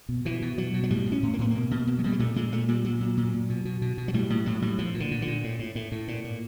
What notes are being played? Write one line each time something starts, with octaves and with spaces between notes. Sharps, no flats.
B2
B2 E3
B2
B2 F#3
B2
F#3
A2 G3
A2
C#4
A2
A#3
A2 B3
B2 A#3
B2
B2
F#3
B2 G3
G#3
A#2 A3
A#2 G#3
A#2 A3
A#2 G3
A#2 F#3
A#2
A#2
A#2
B2
B2
B2
B2
F#3
A2 G3
A2 G3
A2 F#3
A2 G3
A#2 F3
A#2
D3
A#2
D3
A#2
A2
A2
A2
A2
A#2
A#2